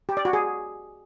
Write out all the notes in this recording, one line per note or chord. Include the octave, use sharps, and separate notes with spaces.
G4
D5
F#4
G#4